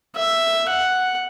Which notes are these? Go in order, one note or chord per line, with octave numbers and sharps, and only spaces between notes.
E5
F#5